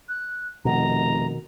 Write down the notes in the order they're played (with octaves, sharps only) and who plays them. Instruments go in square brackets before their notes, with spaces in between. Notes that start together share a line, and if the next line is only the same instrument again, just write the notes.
[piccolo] F#6
[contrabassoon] F1 [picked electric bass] B2 D#3 [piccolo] A#5